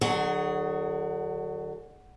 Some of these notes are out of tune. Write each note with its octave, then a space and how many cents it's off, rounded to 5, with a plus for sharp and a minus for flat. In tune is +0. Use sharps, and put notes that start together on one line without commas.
D3 +40 F#3 +0 G#4 +0